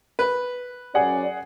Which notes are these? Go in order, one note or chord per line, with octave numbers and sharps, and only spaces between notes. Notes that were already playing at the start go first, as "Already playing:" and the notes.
B4
F#2 C#4 G#4 D5 F#5